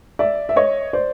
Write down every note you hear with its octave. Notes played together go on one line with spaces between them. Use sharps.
D5 E5
E5
C#5 D#5
C5 D5